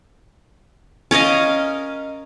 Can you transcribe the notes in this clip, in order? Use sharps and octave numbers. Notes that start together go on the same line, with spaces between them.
C#4 A#4 D#5 F5